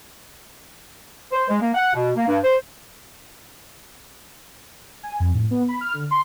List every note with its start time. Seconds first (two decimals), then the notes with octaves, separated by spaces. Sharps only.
1.32 C5
1.49 G#3
1.62 A#3
1.75 F#5
1.94 B2
2.16 A#3
2.28 G2
2.44 C5
5.03 G#5
5.20 F2
5.34 A2
5.51 B3
5.68 B5
5.81 F6
5.94 D3
6.11 C6